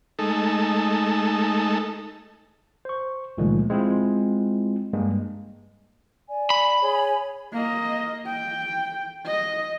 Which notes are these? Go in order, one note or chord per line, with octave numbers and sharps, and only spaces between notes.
G#3 A3 D#4 A4
C5 C#6
C#2 A#2 D#3 F3 G#3 A3
G#3 C4 E4 F4
G2 G#3 A#3 D4
D5 G#5
B5
G#4 C#5 G#5
A#3 D#5
G5
D#5